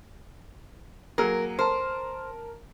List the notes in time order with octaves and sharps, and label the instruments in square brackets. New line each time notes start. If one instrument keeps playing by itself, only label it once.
[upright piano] F#3 A#3 G#4 [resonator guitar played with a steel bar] A#4
[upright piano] A#4 A5 [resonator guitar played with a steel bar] C5